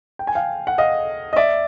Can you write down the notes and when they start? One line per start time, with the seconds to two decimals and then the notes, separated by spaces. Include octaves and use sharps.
0.19 G5
0.27 G#5
0.35 F5 G5
0.67 F#5
0.78 D#5 F5
1.33 D#5
1.36 D5 E5